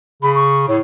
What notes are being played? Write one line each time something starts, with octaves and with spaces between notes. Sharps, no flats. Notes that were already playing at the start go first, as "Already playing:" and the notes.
C#3 B5
C#6
A2 C#5